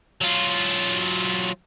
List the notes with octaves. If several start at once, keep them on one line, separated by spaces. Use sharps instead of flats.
F#3 F4